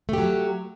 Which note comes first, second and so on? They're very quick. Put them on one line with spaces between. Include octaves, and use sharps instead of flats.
A3 G4 F#3